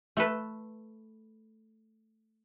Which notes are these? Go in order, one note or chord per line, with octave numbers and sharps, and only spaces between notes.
A3 A4 B4